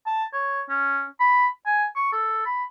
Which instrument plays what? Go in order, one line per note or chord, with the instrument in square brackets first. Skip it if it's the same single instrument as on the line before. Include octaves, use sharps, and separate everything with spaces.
[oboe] A5
C#5
C#4
B5
G#5
C#6
A4
B5